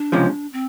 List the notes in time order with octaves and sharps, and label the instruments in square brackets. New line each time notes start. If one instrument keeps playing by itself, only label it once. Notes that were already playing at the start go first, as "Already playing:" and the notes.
Already playing: [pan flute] D4
[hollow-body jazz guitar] C#2 C3 F3 G#3 C#4
[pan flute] C4